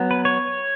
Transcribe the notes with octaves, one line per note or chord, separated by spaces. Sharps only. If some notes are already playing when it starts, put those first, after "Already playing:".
Already playing: F#3 B3
B4
C#5